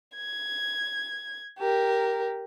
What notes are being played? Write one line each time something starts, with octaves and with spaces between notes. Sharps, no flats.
G#6
G4 A#4